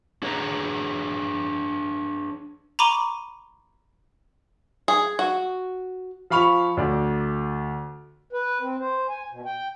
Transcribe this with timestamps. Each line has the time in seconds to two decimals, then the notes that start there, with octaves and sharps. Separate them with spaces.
0.22 D4 G#4 B4 C#5 F5 A#5
2.79 A#5 B5 C#6 D6 D#7 G7
4.88 G#4
5.19 F#4
6.30 F3 F5 B5 C#6 F7
6.77 D2 D5
8.33 B4
8.61 C4
8.79 C5
9.08 G#5
9.31 B2
9.46 G5